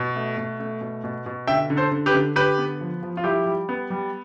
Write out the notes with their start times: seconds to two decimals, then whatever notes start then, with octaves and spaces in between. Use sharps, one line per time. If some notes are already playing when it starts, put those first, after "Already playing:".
Already playing: B2
0.16 A3
0.37 B2
0.60 A3
0.81 B2
1.04 B2
1.26 B2
1.47 D3 E5 G5
1.70 D3
1.77 A4 C5
1.91 D3
2.06 G4 B4
2.14 D3
2.36 D3 G4 B4
2.58 B3
2.81 F3
3.03 F3
3.17 F4
3.24 G3 E4 G4
3.46 G3
3.69 B3
3.90 G3